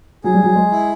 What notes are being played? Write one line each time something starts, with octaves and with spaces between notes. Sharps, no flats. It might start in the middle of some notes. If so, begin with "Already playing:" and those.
F#3 G#4
G3
F#3
G#3
E4